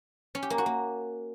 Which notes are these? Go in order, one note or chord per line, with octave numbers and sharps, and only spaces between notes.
C#4
G4
A#3
F#4
A#3